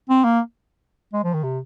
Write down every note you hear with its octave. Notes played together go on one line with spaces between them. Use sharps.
C4
A#3
G#3
F3
D#3
C3